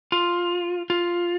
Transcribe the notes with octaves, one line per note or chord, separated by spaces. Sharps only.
F4
F4